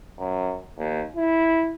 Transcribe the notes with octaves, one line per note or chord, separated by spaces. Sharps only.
F#2
D#2
E4